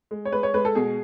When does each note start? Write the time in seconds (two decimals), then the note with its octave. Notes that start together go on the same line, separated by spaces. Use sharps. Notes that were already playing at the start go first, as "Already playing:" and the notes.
0.11 G#3
0.25 C#5
0.32 G#3 B4
0.43 C#5
0.54 G#3 B4
0.65 A4
0.75 B2 G#4